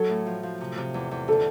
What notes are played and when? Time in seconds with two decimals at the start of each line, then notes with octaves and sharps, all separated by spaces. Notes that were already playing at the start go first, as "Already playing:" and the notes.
Already playing: F#3 A4
0.09 A2
0.26 F3
0.43 F3
0.61 C3
0.78 C3
0.94 E2
1.11 E2
1.28 D3 A4